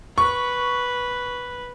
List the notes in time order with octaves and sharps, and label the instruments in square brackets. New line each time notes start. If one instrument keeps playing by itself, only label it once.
[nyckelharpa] B4 [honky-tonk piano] C#6